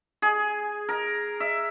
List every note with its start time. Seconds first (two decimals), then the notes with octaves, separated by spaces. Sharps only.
0.22 G#4
0.89 A#4
1.40 E5